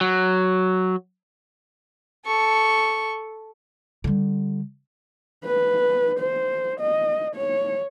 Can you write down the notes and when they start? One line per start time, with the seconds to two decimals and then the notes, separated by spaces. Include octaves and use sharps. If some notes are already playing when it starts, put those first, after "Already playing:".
0.01 F#3
2.26 A4 C#6
4.04 D3 G3
5.44 B4
6.19 C5
6.80 D#5
7.35 C#5